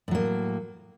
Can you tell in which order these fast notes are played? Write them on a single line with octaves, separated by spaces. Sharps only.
A2 F#3 A#3